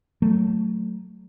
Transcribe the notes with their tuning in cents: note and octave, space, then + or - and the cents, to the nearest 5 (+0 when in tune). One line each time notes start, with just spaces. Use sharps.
F#3 +5 A3 +0